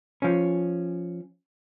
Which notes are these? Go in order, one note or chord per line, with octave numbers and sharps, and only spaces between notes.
F3 C#4